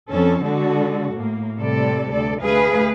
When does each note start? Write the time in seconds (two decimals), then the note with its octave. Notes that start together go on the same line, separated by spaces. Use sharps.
0.11 F2 C#4 A4
0.43 D3 G#3 F#4 A4
1.12 A2 A#3
1.59 A2 C3 G3 A4 D5
2.12 D2 A4 D5
2.43 D2 A3 G#4 B4 F5